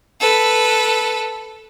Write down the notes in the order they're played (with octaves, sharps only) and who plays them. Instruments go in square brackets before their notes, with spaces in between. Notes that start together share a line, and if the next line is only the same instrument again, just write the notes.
[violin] A4 B4